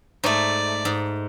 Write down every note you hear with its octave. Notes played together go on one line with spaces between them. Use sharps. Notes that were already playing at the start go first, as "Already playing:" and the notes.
G#2 A3 D5
G#2